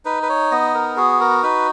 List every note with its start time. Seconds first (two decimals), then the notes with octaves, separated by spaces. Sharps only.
0.05 D#4 B4
0.23 B4
0.29 C#5
0.51 B3 D#5
0.74 A#4
0.97 F#4 G#4
1.20 A#4
1.43 D#4 B4